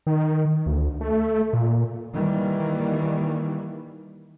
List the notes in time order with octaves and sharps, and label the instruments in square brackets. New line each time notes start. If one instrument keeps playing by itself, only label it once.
[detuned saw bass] D#3
D2
A3
A#2
[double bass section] D#3 E3 G3 A#3